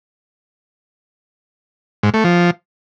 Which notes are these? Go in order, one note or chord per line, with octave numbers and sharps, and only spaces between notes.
G#2
A3
F3